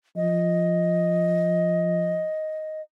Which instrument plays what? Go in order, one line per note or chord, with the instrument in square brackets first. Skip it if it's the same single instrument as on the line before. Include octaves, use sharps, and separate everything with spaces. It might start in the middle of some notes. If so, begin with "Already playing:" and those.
[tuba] F3 [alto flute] D#5